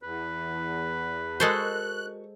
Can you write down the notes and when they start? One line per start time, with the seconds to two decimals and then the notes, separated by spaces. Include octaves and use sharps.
0.03 E2 B4
1.40 G#3 F#4 A4 A#4 C5 D#5 F#6